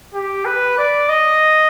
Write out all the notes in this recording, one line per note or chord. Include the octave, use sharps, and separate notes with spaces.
G4
B4
D5
D#5